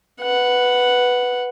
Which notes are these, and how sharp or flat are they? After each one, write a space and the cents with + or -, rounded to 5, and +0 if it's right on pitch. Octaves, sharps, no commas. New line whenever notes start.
B4 +0 F#5 +0